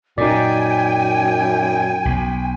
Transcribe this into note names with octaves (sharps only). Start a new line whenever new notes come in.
F#2 A#2 D#4 D5 G5 G#5
B1